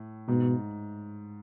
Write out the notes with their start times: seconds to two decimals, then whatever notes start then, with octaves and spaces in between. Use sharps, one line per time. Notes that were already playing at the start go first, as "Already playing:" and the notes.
Already playing: A2
0.28 G#2 B2